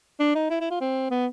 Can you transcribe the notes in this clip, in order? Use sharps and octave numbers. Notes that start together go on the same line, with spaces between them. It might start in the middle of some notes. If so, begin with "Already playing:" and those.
D4
D#4
E4
E4
F4
C4
B3